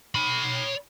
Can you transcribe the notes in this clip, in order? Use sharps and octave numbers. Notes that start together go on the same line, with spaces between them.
C#5 B5